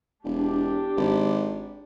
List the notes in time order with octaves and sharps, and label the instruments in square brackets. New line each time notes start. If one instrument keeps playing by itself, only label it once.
[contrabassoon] E1 [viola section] D4 G4
[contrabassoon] G#1